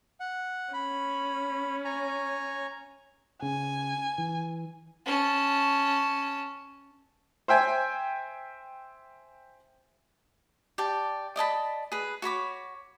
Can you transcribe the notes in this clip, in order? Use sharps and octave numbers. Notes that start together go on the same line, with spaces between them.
F#5
C#4 B5
C#5 G#5 A#5
C#3 G#5
E3
C#4 A5
C5 E5 G5 G#5
G4 D5 A5
D5 D#5 A5 B5
G#4 B4
F#4 C#5 B5 D6